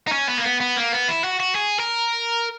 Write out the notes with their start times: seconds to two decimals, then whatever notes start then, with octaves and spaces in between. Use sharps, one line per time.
0.07 D#4
0.12 C#4
0.29 B3
0.38 A#3
0.44 B3
0.61 B3
0.76 A#3
0.92 B3
1.08 E4
1.24 F#4
1.40 F#4
1.55 G#4
1.80 A#4